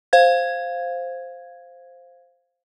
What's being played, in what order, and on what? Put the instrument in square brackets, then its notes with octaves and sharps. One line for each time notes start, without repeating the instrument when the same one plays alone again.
[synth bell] C5 F5 G#6